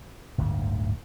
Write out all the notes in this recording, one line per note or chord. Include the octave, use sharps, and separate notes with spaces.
D1 G1 D2 G#2